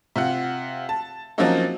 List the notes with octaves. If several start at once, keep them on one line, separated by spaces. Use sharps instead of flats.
C3 F4 F#5
A5
F3 F#3 A#3 C4 C#4 D#4